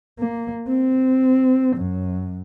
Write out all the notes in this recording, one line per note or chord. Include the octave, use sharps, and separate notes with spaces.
A#3
C4
F#2